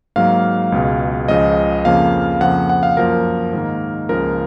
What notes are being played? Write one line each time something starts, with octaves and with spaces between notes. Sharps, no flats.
G#2 F#3 A#3 F5
C#2 B2 G#3
C#2 C#3 F3 D#5
F2 C#3 F3 A#3 F5
F2 C#3 F3 A#3 F#5
F#5
F5
F#2 F3 A#3 A#4
G#2 D#3 A#3
C#2 C#3 F3 A#3 A#4